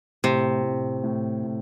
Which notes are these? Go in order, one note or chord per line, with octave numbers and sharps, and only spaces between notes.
A2 C3
A2
A2
A2